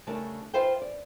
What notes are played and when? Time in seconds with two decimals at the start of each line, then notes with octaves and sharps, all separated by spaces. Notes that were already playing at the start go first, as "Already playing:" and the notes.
0.07 C#3 G3 A3 D4 A#4 A5
0.54 F4 B4 C5 E5 F5 G5
0.82 D5